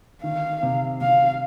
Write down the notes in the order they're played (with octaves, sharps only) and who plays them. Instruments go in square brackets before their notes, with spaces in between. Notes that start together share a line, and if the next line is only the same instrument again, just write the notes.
[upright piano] D#3 [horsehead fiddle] F5
[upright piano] C3
[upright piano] C3 [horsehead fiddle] F5